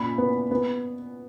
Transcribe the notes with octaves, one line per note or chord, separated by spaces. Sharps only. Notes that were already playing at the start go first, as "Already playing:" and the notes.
Already playing: A#2 C#4 B5
B3
B3